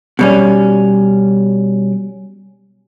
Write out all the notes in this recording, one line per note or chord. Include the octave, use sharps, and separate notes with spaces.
B2 G3 C#4